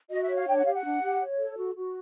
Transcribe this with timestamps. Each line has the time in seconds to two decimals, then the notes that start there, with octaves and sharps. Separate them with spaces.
0.10 F#4 D#5
0.23 E5
0.29 C#5
0.35 F5
0.47 D4 G5
0.56 F#5
0.65 G4 F5
0.74 F#5
0.84 D4
1.02 G4
1.21 C#5
1.38 A4
1.57 F#4
1.76 F#4